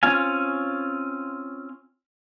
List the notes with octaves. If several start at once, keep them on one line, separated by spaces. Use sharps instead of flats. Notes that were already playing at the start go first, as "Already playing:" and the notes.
C4 C#4 F4 F5 G#5